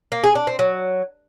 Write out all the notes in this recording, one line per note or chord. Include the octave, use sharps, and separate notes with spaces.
A#3
G#4
D4
C4
F#3